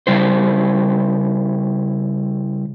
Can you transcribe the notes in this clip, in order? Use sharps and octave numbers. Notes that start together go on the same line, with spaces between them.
C#3 G3 E4 C5